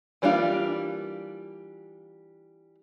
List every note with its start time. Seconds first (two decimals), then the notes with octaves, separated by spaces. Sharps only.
0.22 E3 G3 A#3 D4 F4